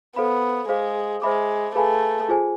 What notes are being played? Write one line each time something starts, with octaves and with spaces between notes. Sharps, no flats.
B3 A4 C5 F5 B5
G#3 G#4 C5 F5
G#3 C5 E5 B5 D6
A3 G#4 B4 F5 G#5 B5
F4 G#4 C5 G#5